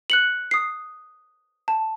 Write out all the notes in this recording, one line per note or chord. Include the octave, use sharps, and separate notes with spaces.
F#6 C#7 F#7
D#6 C7
A5